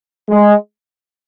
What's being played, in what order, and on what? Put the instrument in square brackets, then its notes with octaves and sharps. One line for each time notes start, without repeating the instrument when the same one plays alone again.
[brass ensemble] G#3